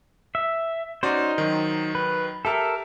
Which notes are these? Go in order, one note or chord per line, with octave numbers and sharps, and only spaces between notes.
E5
C#4 D#4 F#4 C5 D5
D#3 F#3
B4
G4 A4 A#4 E5 A5